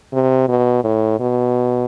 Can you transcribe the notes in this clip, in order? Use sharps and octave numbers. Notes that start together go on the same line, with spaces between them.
C3
B2
A2
B2